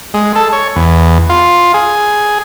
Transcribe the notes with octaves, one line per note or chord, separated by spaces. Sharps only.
G#3
A4
C#5
E2
F4
G#4